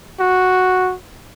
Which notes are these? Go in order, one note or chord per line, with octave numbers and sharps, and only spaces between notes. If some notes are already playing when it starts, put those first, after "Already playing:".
F#4